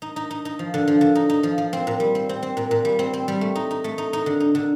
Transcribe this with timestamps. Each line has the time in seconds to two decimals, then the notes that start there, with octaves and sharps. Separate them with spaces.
0.02 D#4
0.16 D#4
0.31 D#4
0.45 D#4
0.59 F3
0.74 D3
0.88 F3
1.01 D3
1.15 D#4
1.30 D#4
1.43 F3
1.58 F3
1.73 C4
1.87 A#2
2.00 G3
2.15 C4
2.29 C4
2.43 C4
2.57 A#2
2.71 A#2
2.85 G3
2.99 C4
3.13 C4
3.28 G3
3.41 A3
3.55 D#4
3.71 D#4
3.84 A3
3.98 D#4
4.13 D#4
4.26 D3
4.40 D#4
4.55 D3